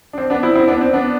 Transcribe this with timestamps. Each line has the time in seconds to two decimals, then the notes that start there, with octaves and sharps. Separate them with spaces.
0.13 D4
0.18 C4
0.30 B3 D4
0.43 C4 E4
0.55 C4 E4
0.68 B3 D4
0.81 C4
0.93 B3 D4